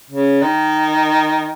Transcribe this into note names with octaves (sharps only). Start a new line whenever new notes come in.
C#3
D#3